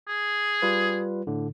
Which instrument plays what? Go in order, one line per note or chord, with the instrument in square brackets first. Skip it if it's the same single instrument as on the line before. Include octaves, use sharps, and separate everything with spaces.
[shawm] G#4
[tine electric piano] G3 F4 B4
A2 D3